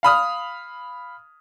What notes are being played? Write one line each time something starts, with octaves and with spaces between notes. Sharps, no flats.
F5 B5 D#6 F6